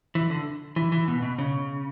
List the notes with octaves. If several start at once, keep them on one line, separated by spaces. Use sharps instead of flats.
E3
D3
E3
E3
B2
B2
C#3